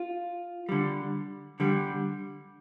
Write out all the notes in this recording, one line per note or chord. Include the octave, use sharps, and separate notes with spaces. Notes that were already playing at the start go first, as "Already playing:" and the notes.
Already playing: F4
D3 G3
D3 G3